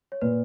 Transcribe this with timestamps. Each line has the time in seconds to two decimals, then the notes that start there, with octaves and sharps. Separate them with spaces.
0.12 C#5
0.21 A#2 B4